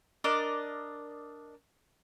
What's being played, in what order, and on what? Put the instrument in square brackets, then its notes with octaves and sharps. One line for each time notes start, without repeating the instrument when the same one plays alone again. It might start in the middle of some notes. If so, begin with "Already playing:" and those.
[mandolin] D4 A#4 D5 D#5